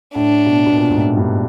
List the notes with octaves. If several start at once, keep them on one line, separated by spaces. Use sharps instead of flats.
A2 D4
B2
B2
A#2
G#2
A2
G2